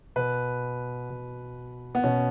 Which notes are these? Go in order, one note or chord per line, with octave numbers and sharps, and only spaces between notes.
B2 B4
B2
B3
B2 C#4